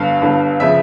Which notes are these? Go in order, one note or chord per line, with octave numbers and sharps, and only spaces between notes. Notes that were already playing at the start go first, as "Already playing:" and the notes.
Already playing: G1 G2 D3 F5
G1 G2 D3
C#3 F3 E5